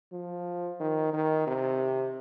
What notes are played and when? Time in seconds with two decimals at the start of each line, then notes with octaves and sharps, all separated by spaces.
0.12 F3
0.80 D#3
1.13 D#3
1.47 C3